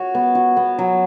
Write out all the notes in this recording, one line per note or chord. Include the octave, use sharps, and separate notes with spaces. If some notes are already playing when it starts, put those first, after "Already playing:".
Already playing: F#4 C#5
B3
F#4
B3
F#3